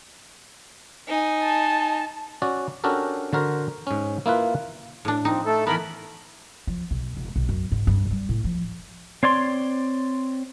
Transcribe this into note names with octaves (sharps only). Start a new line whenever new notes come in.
D#4 G#5
A5
C#4 F#4 D5
C#4 D4 F#4 G4 A4 A#4
D3 F#4 A#4 C5
G#2 C#4
A#3 E4 F4 B4
A2 D4
F3 C4 D#4
A3 A4
E3 B3 A#4 B5
F3
B1
E1
B1
F#2
G#2
G2
G3
A2
F3
C4 C#5 D5 C6